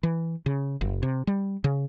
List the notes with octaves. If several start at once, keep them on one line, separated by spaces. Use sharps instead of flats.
E3
C#3
F#1
C3
G3
C#3